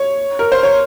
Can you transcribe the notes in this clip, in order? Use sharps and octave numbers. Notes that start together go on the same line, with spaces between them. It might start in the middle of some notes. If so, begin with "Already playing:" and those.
Already playing: C#5
A#4
C5
C#5